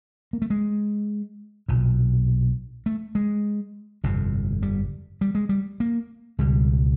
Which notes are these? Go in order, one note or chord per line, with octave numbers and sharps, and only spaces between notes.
A#3
A3
G#3
B1 A#2
A3
G#3
G1 F2 C3
G3
G3
G#3
G3
A#3
C#2 B2 G3